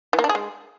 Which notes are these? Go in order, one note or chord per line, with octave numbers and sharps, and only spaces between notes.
E3
A#3
D4
G#4
G#3